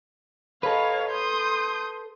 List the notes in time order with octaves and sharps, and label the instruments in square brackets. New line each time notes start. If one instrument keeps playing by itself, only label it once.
[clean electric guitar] A4 B4 [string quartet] C#5 D#5 F5
[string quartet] C6 D#6 G6